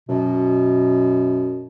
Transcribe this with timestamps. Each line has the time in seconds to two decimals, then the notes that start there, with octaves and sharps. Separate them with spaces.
0.09 F#2 B2